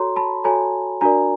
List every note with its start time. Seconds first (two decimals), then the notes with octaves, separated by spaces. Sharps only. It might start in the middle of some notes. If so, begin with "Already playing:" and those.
Already playing: F#4 A4 C#5 A#5 C6
0.16 A5 B5
0.44 F#4 A4 C#5 G#5 A#5
1.01 D4 F#4 A#4 D5 G#5 A#5